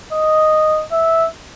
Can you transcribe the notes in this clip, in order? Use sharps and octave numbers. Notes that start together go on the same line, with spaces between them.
D#5
E5